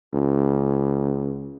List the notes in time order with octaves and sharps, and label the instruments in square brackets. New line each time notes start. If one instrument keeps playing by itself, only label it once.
[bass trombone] C#2